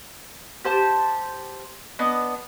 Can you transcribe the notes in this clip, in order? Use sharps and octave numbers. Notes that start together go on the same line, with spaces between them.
G4 C5 A5
B3 D4 D#5